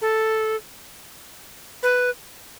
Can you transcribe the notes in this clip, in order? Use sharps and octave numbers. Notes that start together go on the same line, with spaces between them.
A4
B4